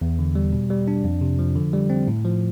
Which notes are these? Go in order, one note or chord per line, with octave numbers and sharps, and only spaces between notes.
E2
D3
G3
B2
G3
D4
F2
C3
F3
D3
G3
C4
A2
F3